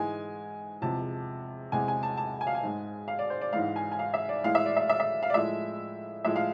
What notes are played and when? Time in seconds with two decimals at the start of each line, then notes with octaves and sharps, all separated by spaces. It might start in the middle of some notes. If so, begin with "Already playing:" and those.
Already playing: G#2 E3 G#3 G#5
0.81 E2 C3 F3 G#3 A5
1.72 E2 C3 G#3 G#5
1.88 G#5
2.03 A5
2.17 A5
2.41 G#5
2.47 F5
2.55 G#5
2.63 G#2 G#3
3.08 F5
3.19 D5
3.30 C5
3.41 D5
3.53 G#2 E3 G#3 F5
3.76 G#5
3.92 G#5
3.99 F5
4.14 E5
4.29 D5
4.44 A2 E3 G#3 F5
4.55 E5
4.66 D5
4.76 E5
4.89 E5
5.00 E5
5.23 F5
5.30 D5
5.34 A2 F3 G#3 E5
6.24 A2 F3 G#3 E5
6.36 F5